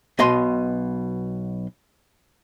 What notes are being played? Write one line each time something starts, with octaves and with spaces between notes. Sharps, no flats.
B1 B2 D#5 C6